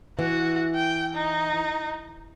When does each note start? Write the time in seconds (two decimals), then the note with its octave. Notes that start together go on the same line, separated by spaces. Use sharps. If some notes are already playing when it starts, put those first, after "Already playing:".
0.19 E3 F#4
0.75 G5
1.15 D#4